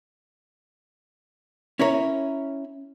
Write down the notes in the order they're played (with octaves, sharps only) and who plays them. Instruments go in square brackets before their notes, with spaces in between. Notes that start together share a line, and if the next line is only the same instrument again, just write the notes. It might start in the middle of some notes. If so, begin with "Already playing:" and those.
[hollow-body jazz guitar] C#4 E4 A#4 C#5